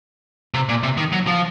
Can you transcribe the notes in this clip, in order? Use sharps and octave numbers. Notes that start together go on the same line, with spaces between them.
C3
A#2
C3
D#3
F#3
F3